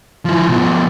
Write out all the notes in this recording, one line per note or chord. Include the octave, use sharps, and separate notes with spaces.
F3 E4
B2 F3